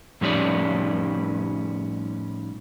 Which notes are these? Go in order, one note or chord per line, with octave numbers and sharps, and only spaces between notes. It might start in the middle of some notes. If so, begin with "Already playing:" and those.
A2 F3 G3 C#4 D#4 D5